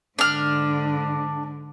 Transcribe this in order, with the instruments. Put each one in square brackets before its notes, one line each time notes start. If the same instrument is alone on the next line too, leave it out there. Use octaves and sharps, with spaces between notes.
[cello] G#2 D3 [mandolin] D4 F6